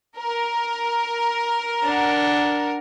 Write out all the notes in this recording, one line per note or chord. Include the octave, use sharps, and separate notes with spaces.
A#4
D4 F#5